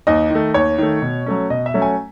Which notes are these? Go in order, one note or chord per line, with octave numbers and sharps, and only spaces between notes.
D#2 D#5
D#3 A3
D#2 C#5
D#3 A3
B2
F#3 A3 C#4
B2 D#5
E5
F#3 A3 C#4
G#5